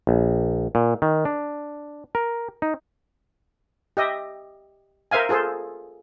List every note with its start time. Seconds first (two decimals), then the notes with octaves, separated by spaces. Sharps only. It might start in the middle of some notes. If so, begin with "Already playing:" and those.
0.07 A#1
0.75 A#2
1.02 D#3
1.25 D4
2.15 A#4
2.62 D#4
3.97 G4 D#5 E5
5.11 A#4 C5 E5 F5 G#5
5.29 F4 G#4 A4 C5